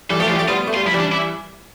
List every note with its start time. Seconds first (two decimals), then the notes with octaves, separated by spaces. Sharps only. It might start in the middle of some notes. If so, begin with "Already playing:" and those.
0.10 E3 G3 A4
0.19 F3 A3 G4
0.28 E3 G3 F4
0.36 F3 A3 G4
0.48 G3 B3 F4
0.67 A3
0.74 G3 F4
0.85 F3 E4
0.94 E3 G3
1.00 D4
1.12 E4